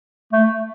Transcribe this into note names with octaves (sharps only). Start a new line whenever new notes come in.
A3